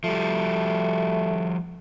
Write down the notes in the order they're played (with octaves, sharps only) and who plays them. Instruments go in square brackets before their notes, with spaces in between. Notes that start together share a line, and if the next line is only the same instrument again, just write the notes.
[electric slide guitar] F3 G3 [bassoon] A3